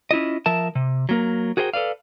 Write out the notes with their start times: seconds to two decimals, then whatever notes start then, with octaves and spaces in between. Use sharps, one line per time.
0.11 C#4 E4 F4 D#5
0.46 F3 A#4 E5 A5
0.75 C3
1.09 F#3 A#3 A#4
1.57 F#4 G#4 A#4 C5 E5 G5
1.73 A4 B4 D5 F5